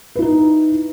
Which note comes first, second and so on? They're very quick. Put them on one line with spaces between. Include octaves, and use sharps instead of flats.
B4 E4 D#4